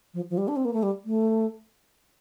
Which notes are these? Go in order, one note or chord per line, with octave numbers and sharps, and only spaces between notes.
F3
F3
G3
D4
C4
A#3
A3
G3
A3